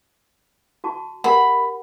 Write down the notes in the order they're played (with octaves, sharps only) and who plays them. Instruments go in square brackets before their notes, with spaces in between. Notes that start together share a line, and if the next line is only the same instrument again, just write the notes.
[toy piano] F#4 A5 C#6
[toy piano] G4 A#4 F#5 [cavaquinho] B5